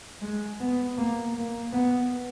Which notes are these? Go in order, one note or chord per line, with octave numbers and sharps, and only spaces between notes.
G#3
B3
A#3
A#3
B3